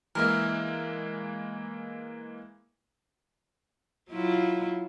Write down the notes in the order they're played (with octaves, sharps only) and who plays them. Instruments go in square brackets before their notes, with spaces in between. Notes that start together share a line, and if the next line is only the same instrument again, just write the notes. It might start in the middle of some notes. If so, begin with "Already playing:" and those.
[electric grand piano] E3 G#3 A#3 [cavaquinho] A#4 E5
[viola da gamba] F#3 E4 F4